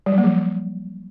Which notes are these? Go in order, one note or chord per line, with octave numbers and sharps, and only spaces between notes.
G3
F#3
A#3
F3